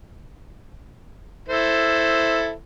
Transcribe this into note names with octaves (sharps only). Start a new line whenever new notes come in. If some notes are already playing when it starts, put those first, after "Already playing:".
E4 A4 C5